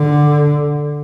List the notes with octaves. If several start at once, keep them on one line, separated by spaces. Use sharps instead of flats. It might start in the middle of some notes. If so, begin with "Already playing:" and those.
Already playing: D3